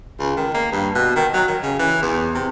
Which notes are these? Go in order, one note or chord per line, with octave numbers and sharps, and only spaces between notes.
C#2
D#3
A#3
G2
B2
D#3
F#3
D#3
C#3
E3
E2
C3